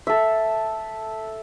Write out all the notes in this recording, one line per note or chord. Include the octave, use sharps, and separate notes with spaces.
A4 E5